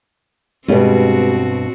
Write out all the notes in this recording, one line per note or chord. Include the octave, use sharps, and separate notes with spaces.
G2 B2 G#3 C4 F#4 G4 B4